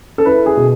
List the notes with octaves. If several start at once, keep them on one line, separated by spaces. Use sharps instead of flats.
A4
E4 B4
G#4
B2